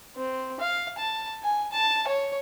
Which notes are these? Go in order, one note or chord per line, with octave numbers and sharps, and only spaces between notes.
C4
F5
A5
G#5
A5
C#5